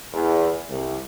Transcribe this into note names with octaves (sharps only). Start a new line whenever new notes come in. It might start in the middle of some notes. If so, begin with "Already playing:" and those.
E2
C2